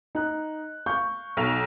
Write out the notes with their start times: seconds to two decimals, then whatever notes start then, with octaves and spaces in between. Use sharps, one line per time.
0.15 D#4 F#6
0.86 F5 C#6 G6
1.37 B1 F7